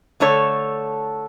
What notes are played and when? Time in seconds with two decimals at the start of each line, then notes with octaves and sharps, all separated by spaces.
0.20 D3 A3 A4 C#5